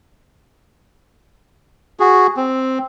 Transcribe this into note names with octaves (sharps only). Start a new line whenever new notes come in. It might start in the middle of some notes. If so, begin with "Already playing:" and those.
F#4 G#4
C4